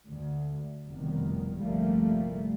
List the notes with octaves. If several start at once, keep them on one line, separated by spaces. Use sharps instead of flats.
D2
F1 C2 B2 D#3
G1 C2 F3 G3 A3 A#3